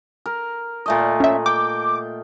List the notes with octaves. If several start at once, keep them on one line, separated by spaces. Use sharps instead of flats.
A#4
A#2 A3 D#5
C#4 E5
G5 D6